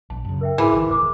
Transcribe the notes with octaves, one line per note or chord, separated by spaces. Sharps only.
A#1 A5
F#2 C#3
A#4 E5 G5
G#2 E3 F#4 G#4
A1 D#3
E1 C5 D6